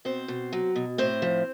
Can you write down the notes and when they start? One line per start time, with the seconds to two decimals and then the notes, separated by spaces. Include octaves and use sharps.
0.05 B2 C4 C5
0.28 B2
0.53 F#3
0.76 B2
0.98 A2 C4 C5
1.22 F3